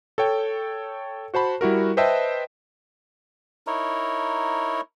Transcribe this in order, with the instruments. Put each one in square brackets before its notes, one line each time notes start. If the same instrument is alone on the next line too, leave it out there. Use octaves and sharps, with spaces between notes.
[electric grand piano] A4 C#5 G5
F#4 C5 A5 B5
G3 E4 F#4 A#4
B4 C5 D#5 E5 G5 A5
[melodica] D#4 E4 A#4 C#5